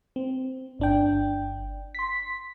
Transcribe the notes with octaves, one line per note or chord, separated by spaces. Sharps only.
C4
G1 D4 G5
C6 B6